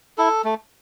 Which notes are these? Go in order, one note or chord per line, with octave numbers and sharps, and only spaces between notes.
E4 A4
A3